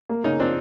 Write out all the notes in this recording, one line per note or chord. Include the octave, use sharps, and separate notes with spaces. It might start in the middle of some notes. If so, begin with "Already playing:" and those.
A#3
C#3 C#4 D#4
F3 C4 D4